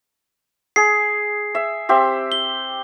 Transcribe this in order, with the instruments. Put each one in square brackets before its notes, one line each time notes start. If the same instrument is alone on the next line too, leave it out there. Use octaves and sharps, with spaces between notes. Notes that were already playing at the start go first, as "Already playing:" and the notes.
[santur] G#4 [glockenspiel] C7
[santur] E5
C4 G4 E5
[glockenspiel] G7